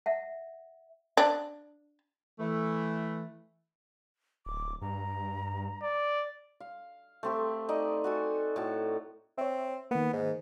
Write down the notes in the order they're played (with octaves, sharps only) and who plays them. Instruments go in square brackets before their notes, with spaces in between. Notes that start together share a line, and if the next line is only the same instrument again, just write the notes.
[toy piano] E5 F#5
[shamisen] D4
[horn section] E3 A3
[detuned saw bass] D1 [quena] D6
[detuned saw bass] G2 [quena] A#5
[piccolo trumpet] D5
[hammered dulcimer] F5
A3 C4 G4
D#4 D5 D#5
F#4 A4 G#5
A2 F#4 A5
[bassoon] C4 [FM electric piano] C#5 E5
[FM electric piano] D#3 A#3 [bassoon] B3
[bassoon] G#2